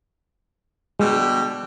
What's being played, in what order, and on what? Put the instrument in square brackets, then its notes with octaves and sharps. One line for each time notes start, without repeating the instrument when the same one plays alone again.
[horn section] B2 D3 G3 [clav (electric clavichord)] G#3